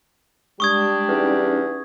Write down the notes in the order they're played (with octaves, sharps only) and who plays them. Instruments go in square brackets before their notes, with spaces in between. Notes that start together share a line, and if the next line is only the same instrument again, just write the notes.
[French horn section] G3 D4 G4 [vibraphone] G#3 [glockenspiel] C#6 D#6 G#6
[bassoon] E2 [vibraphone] C#4 D#4